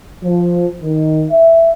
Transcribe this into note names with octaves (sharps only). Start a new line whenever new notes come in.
F3
D#3
E5